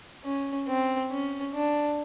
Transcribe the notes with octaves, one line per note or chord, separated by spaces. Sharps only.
C#4
C4
C#4
D4